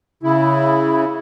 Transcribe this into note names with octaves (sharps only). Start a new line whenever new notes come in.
C#3 E4